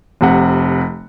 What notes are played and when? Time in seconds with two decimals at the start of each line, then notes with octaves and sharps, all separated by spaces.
0.21 F1 C3 F#5